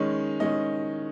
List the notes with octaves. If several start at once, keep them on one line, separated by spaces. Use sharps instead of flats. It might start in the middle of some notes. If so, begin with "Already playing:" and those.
Already playing: D#3 G#3 C#4
D#3 G#3 C#4 D#5